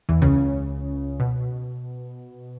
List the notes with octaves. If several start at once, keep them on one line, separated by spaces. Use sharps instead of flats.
E2 E3
C#2 C#3
B2